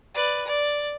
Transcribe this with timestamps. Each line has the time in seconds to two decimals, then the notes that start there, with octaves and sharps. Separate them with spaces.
0.14 B4 D5
0.46 D5